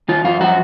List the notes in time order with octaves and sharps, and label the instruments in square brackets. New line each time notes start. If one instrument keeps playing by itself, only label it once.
[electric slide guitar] D#3 F4
F#2 F4
F3 F#4